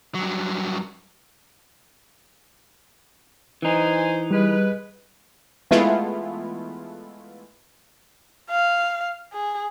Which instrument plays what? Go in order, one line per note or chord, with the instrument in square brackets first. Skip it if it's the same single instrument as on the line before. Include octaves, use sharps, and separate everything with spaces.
[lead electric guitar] G2 F#3
[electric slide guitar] E3 D#4 [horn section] C5 G#5
[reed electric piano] G3 [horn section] G#3 B4
[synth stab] E3 G#3 A3 B3 E4 F4
[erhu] F5
G#4